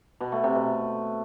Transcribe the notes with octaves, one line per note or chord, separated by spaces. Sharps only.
B2
A3
C3
B2